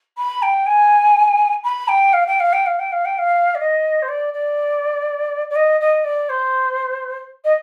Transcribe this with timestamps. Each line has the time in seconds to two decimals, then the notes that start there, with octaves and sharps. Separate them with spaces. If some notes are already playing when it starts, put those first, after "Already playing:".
0.17 B5
0.42 G5
0.66 G#5
1.64 B5
1.88 G5
2.13 F5
2.27 G5
2.40 F5
2.53 G5
2.66 F5
2.79 G5
2.92 F5
3.05 G5
3.18 F5
3.55 D5
3.59 D#5
4.02 C5
4.08 D5
4.33 D5
5.50 D5
5.55 D#5
5.80 D#5
6.04 D5
6.29 C5
7.44 D#5